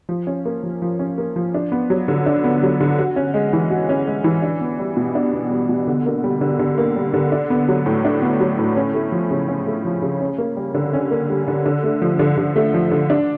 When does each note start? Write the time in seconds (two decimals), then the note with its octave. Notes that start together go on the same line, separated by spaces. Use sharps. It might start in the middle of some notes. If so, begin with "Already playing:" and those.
0.09 F3
0.27 C#4
0.45 A#3
0.63 F3
0.82 F3
0.99 C#4
1.18 A#3
1.36 F3
1.54 D4
1.72 B3
1.90 F#3
2.08 D3
2.26 D4
2.44 B3
2.63 F#3
2.80 D3
2.98 F#4
3.16 C#4
3.34 G#3
3.53 E3
3.70 F#4
3.89 C#4
4.07 G#3
4.24 E3
4.42 D4
4.61 B3
4.79 G3
4.97 B2
5.15 D4
5.33 B3
5.51 G3
5.69 B2
5.87 D3
6.06 A#3
6.24 G3
6.41 D3
6.59 D3
6.78 A#3
6.96 G3
7.14 D3
7.32 D4
7.50 B3
7.68 F#3
7.86 A2
8.05 D4
8.22 B3
8.40 F#3
8.59 A2
8.76 C#4
8.94 A3
9.12 F3
9.31 C#3
9.48 C#4
9.66 A3
9.85 F3
10.02 C#3
10.21 C#4
10.38 A#3
10.57 G3
10.74 D3
10.93 C#4
11.11 A#3
11.30 G3
11.48 D3
11.66 D3
11.84 A3
12.02 F3
12.19 D3
12.38 D3
12.56 A3
12.74 F3
12.91 D3
13.10 D4